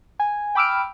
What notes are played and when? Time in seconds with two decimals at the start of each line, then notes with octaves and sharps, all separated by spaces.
0.20 G#5
0.55 G5 B5 D6 E6 F6 D7